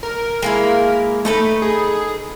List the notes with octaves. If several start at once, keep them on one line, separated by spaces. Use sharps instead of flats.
A#4
G#3 A#3 E4
A3 D#4 A4 B4
G#4